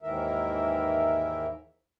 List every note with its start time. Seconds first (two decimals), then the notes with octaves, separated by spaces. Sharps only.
0.02 D#2 G#2 D#3 E3 A#4 E5